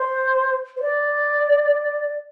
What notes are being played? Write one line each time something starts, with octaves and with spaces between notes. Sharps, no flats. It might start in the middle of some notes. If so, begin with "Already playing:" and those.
Already playing: C5
C5
D5